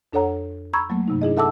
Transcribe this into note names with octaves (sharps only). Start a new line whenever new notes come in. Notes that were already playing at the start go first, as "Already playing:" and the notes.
F2 D4 A4 C#5 F#5 A#5
A#5 B5 C#6 E6 G#6
F#3 A3 A#3
G2 C3 D#4
D4 E4 G#4 D#5
A4 E5 F#5 A5 D6 E6